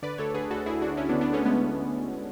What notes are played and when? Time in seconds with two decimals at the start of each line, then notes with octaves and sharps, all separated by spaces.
0.02 D3 B4 D5
0.18 D2 A4 C#5
0.34 D3 G#4 B4
0.50 D2 F#4 A4
0.66 D2 E4 G#4
0.81 D2 D4 F#4
0.97 D2 C#4 E4
1.09 B3 D4
1.13 D3
1.21 B3 D4
1.30 D3 A3 C#4
1.45 G#3 B3